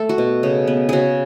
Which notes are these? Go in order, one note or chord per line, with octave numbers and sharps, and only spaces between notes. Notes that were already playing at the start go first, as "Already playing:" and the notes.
Already playing: A3 A4
F#4
B2
C#3
B3
C#3 F#4 G#4